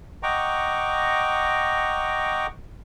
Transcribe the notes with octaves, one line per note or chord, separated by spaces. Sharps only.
D#5 F#5 G5 A#5 C#6 D6